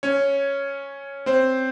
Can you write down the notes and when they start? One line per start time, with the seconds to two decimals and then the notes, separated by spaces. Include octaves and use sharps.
0.03 C#4 C#5
1.26 C4 C5